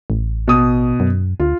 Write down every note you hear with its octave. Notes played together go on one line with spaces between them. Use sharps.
A1
B2 D#6
F#2
D2 F4